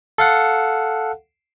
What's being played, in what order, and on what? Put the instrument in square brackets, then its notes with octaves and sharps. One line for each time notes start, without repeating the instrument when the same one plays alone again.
[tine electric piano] A4 F5 F#5